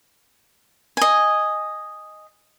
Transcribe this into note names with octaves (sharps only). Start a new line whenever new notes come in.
D#5 G#5